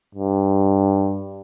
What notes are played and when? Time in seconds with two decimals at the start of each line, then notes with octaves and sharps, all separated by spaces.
0.15 G2